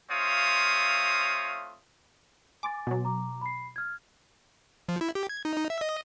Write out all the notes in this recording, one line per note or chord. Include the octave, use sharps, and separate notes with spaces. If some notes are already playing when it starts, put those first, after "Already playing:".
A3 C4 F4 C#5 F5 D#6
G#5 C6 D6 A6
B2 F#3
A#5 D6
B5 C7
F6 G#6
F3
E4
G4
G#6
D#4
D#4
E5
D#5